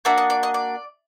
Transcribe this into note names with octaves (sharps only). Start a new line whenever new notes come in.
A#3 D4 F#4 E5
D#5
D5
D#5
D5